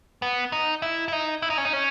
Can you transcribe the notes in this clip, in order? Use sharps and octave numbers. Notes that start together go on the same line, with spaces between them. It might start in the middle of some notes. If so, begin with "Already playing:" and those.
B3
D#4
E4
E4
D#4
E4
D#4
C#4
D#4
C#4